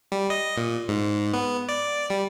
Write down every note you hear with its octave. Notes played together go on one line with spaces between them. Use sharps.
G3
D#5
A#2
G#2
B3
D5
G3